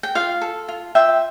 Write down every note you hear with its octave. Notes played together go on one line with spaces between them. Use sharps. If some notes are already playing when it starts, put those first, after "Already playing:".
G5
F4 F5
A4
F4
F4 E5 G5